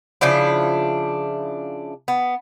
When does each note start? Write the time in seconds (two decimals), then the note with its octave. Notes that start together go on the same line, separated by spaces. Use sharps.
0.21 C#3 F3 D4 E4
2.08 B3